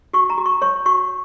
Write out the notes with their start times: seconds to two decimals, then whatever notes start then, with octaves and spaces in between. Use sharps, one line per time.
0.13 F#4 C#6
0.30 A#5
0.38 F#4
0.46 C#6
0.62 C#5 C#6
0.86 F#4 C#6